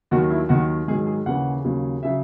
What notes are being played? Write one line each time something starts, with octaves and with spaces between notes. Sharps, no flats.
D#2 D#3 F#3 F#4
E4
D#2 D#3 F#3 F#4
G#2 D#3 F#3 G#4
G#4
D#2 C#3 E3 F#5
D#2 C#3 F#3
C#3 F#3 E5